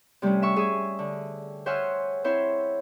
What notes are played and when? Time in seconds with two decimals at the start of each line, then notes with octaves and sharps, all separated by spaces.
0.22 C3 G3 A3 C4 C#4
0.42 E5 C#6
0.56 G#4 E5
0.99 D3
1.66 C5 C#5 E5 F#5 G#5 F6
2.24 C4 E4 C5 C#5 E5